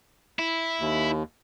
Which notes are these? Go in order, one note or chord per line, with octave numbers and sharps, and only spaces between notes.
E4
D#2